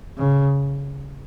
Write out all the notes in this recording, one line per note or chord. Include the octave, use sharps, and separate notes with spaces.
C#3